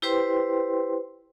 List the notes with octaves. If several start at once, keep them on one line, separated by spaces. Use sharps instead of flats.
E4 G4 B4 C5 G5 C6